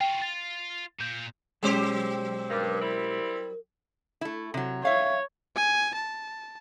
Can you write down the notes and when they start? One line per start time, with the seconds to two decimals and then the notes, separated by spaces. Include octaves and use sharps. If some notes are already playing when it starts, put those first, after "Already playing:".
0.01 F4 F#4 G5
0.22 F4 A6
1.01 A#2 G6
1.63 B1 F#3 G#3 C#4 G4 C5
2.50 G2 A#4
2.82 G3 C4 E4
4.21 A3 E4
4.54 C3 F#3
4.85 C#5 E5 F5
5.55 G#5
5.95 A5